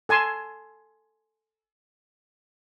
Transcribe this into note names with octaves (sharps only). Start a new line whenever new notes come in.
A4 G#5 A5 C6